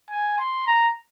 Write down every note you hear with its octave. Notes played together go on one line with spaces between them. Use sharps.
G#5
C6
A#5